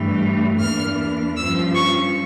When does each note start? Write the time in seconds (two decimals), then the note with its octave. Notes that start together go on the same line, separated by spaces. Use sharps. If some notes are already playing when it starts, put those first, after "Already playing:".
Already playing: G2 E3 A3
0.59 E2 E3 A#3 D4 F6
1.36 G2 F3 C#4 E6
1.74 C#6